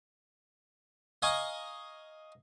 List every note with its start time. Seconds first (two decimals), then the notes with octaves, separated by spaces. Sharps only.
1.22 D#5 F5 G#5 A#5 C#6